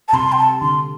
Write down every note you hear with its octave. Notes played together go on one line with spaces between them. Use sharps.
A5
C3 C6
G5
A5
D3 C6